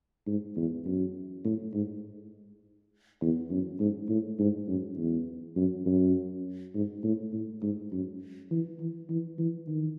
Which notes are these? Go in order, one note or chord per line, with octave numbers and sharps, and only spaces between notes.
G#2
E2
F#2
A2
G#2
E2
F#2
G#2
A2
G#2
F#2
E2
F#2
F#2
G#2
A2
A2
G#2
F#2
E3
E3
E3
E3
D#3